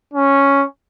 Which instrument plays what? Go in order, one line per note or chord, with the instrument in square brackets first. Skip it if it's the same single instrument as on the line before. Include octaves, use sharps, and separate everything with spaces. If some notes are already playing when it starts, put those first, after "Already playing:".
[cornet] C#4